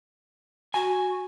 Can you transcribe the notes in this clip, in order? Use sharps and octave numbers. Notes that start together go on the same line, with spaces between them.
F#4 G#5